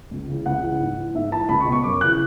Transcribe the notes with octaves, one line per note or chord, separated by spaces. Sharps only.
C#2
C#3 E3
C#2 F#5
C#3 E3
G#2
E3
G#2 E5
E3 A5
C#2 B5
C#6
B2
C#6
F#2 D6
C#3 E3 F#6